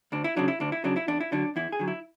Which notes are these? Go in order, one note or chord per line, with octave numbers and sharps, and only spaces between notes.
D2 D4
E4
C#3 F#3 D4
E4
D2 D4
E4
C#3 F#3 D4
E4
E2 D4
E4
D3 F#3 D4
E2 E4
G#4
D3 F#3
E4